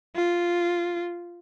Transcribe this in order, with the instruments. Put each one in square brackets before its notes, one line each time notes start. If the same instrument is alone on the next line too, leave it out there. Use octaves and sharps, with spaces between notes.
[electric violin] F4